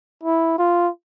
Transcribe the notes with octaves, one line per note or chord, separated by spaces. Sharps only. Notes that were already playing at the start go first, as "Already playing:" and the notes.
E4
F4